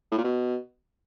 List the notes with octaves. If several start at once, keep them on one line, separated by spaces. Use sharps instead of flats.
A2
A#2
B2